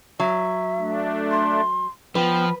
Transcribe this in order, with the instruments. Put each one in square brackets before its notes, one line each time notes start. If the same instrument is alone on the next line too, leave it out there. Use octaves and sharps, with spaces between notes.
[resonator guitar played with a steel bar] F#3 [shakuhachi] E5
[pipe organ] A3 D4
[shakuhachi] C6
[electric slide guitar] F3 [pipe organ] B3 [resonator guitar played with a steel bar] B4 [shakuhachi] G5